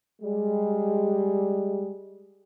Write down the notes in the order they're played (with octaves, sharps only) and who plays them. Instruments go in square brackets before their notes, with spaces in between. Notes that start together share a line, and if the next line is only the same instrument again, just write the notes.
[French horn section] G3 G#3